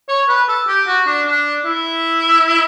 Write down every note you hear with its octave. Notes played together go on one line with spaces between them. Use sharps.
C#5
B4
A4
G4
F#4
D4
D4
E4